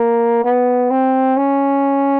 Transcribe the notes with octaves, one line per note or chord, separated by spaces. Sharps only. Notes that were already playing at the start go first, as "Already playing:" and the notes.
Already playing: A#3
B3
C4
C#4